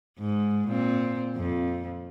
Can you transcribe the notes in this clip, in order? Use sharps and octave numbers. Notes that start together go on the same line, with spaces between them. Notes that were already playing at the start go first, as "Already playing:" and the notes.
G#2
A#2 C4
F2